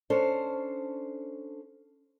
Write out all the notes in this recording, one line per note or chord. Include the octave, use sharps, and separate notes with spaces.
C#4 D4 A4 C5